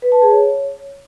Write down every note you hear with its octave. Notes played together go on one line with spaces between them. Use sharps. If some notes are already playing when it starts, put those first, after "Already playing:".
B4
A5
G#4
C#5